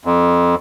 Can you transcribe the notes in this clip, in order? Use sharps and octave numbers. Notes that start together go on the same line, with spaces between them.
F2